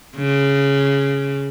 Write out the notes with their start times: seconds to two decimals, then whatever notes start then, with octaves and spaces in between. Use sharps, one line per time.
0.16 C#3